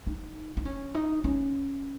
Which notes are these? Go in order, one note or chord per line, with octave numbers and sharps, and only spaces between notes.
D#4
D#4
C#4
D#4
C#4